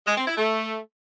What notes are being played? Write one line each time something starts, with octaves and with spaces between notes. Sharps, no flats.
G#3
C4
E4
A3